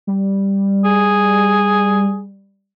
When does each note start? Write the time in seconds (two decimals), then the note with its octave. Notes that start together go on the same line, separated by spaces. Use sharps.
0.07 G3
0.85 G#4